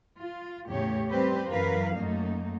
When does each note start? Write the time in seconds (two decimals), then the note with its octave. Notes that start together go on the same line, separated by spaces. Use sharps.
0.19 F4
0.67 E2 A2 C#3 G4 C#5
1.09 G3 C4 G4 B4 C5
1.48 F#2 E3 A#4 B4 F5
1.96 F#2 A3 A#3 D#4